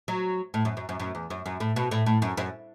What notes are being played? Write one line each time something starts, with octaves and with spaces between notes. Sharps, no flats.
F#3
A2
F#2
F#2
F#2
F#2
E2
F#2
F#2
A2
B2
A2
A2
F#2
F#2